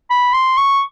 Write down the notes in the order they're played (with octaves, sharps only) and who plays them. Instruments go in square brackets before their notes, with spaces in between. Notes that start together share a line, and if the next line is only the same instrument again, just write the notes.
[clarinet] B5
C6
C#6